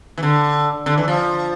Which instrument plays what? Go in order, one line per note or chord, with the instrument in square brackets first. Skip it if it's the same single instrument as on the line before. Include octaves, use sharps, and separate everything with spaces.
[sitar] E3
D3
D3
E3
F3